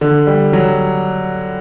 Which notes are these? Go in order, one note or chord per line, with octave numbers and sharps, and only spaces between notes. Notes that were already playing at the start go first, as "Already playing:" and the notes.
D3
G3
F#3